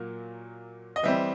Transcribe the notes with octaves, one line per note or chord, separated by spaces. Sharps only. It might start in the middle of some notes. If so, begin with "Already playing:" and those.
Already playing: A#2 F#3 A#3
D#5
E3 G3 C4 E5